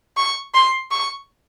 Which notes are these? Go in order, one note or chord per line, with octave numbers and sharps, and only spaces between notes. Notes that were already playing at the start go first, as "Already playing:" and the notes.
C#6
C6
C#6